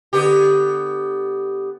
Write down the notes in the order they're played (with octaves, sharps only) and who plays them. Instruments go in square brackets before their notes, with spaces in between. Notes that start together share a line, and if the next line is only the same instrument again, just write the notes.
[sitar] D3 B3 G4